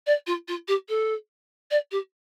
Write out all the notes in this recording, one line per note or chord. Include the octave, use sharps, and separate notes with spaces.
D5
F4
F4
G4
A4
D5
G4